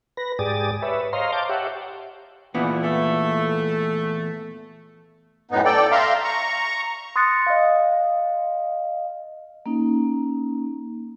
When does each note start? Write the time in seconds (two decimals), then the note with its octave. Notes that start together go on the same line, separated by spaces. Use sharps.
0.17 B4 A#6
0.39 G#2 G4 G#4 D5 D#6 A6
0.82 B4 C#5 E5
1.13 C5 C#5 D#5 F5 A#5 C6
1.32 F5 A5 D6 G6
1.49 G4 C#5 E5 F#5
2.54 E2 A#2 E3 B3
2.82 A3
5.51 F#2 A2 B3 D#4
5.65 A4 D5 G5
5.91 E5 F5 A#5 C6
6.24 A#5 C#6
7.16 C6 D#6 F#6 A6 A#6 C#7
7.47 D#5 F5
9.66 A#3 C#4 D#4